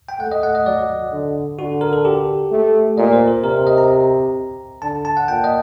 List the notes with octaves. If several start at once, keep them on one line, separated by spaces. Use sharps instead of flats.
G5
A3 F#5
D#5
F#5
D#5
F#3 D5
D3
D3 F#4
A#4
A4
G4
A3
A#2 D#5
C5
A#4
C3 A#4
C5
D#5
A#5
D3 A5
A5
F#5
A#2 G5
D#5